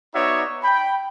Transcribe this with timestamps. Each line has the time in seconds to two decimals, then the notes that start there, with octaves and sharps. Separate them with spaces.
0.15 B3 D#4 F#4 C#5 D5 E5
0.63 G5 B5